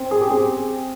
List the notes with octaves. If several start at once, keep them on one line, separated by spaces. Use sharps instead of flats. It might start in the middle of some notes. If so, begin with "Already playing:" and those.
Already playing: C4
G#4
G4
C4 G#4